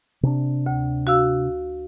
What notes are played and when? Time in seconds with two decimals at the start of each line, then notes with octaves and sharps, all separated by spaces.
0.23 C3 C#4 D4
0.66 D2
1.07 F#4 F5 E6